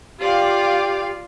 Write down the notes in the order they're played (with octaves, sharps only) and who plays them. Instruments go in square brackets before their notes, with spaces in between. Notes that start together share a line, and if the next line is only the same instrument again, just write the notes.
[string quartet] F4 D5 F5 [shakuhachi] G4